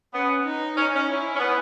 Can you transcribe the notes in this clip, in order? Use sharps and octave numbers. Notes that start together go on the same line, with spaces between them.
B3 C#4
D#4
C#4 D#4
C#4
E4
C#4
B3